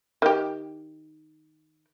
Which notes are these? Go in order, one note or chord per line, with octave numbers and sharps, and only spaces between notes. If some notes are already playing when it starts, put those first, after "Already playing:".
D#3 G4